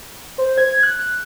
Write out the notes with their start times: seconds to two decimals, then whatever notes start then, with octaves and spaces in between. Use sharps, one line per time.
0.38 C5
0.58 G#6
0.83 F#6